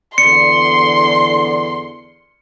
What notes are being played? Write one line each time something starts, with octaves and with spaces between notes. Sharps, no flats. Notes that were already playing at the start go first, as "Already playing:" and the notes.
E2 D3 D5 C6 C#7